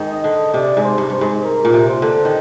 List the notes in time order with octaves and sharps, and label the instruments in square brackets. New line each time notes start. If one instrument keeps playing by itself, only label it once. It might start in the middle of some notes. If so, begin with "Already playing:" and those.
Already playing: [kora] G#2 D#3
[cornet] D#5
[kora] D3
[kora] C3 [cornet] D5
[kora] G#2
[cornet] C5
[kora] G2
[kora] G2 [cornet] C5
[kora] G#2
[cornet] A#4
[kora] A#2
C3
[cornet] C5
[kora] D3
D#3